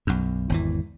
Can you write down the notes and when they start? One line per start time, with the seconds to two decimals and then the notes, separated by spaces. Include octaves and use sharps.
0.07 B1 F#2
0.50 G#1 E2 E3